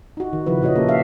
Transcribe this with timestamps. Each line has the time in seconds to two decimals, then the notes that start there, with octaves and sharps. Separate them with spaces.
0.17 D#4 F#4
0.33 D#3
0.46 C#3 F3 E4 B4
0.62 A#2 E4 F#4 C#5 D#5
0.76 A#3 C#4 G4 A4 A#4
0.88 A#3 G4 A#4 E5 F5